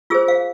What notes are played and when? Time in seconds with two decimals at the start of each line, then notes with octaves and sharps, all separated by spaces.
0.10 F4 G#4 C5 E6
0.28 F5